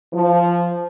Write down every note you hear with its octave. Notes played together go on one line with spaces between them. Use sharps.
F3